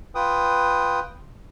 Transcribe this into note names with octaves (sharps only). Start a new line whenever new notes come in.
F4 B4 G5 D#6